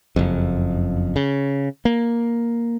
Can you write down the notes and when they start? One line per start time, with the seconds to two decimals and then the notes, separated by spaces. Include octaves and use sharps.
0.16 F#1 F2
1.16 C#3
1.85 A#3